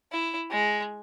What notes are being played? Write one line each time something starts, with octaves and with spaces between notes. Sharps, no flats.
E4
G#3